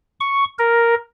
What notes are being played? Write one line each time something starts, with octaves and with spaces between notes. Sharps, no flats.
C#6
A#4